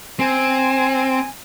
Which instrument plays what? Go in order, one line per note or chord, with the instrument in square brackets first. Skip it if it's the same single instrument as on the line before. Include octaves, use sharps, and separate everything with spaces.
[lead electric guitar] C4 [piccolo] G#5